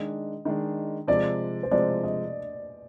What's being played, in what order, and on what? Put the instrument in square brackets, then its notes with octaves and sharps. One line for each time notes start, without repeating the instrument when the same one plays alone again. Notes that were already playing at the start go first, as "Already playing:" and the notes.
Already playing: [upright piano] D#3 G#3 D4 [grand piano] D#5
[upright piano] D#3 G#3 D4
[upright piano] C3 F3 G#3 [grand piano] D5
[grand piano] C5
[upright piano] C3 F3 G#3 [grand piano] D5
[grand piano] D#5